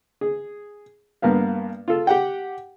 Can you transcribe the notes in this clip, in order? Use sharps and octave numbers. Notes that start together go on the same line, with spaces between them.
G#4
G2 A#3 B3 F5
F4 A4
G4 F#5 G5